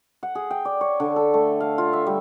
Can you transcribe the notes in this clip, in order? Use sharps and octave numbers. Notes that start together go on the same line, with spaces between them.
F#5
G#4
G5
D5
C#5
D3
A4
A3
F5
F4
E5
G3